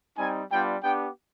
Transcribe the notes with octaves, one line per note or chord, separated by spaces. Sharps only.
G3 C4 D#4 G#5
G3 B3 D4 F4 G5
B3 D4 G4 G5